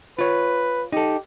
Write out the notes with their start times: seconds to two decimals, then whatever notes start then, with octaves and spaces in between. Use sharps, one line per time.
0.19 F4 B4 C#5
0.92 D#4 G4 A4